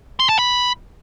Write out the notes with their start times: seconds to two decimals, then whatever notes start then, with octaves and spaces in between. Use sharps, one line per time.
0.20 C6
0.29 A5
0.39 B5